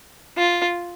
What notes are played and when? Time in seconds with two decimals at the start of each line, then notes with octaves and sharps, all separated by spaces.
0.37 F4